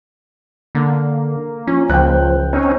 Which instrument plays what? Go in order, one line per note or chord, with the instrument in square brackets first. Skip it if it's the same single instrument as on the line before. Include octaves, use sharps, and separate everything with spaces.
[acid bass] D3 [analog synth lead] A#3
[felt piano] F3 [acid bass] C#4
[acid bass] C#2 [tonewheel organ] F3 [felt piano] G5 F#6
[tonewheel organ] C4 C#4 D#4 [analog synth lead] C#5